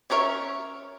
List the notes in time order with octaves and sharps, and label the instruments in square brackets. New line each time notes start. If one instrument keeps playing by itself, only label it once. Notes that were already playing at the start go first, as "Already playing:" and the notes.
[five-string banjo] C#4 D4 A#4 C#5 E5